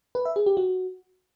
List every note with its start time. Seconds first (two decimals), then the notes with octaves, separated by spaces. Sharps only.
0.15 B4
0.25 E5
0.36 G#4
0.46 G4
0.57 F#4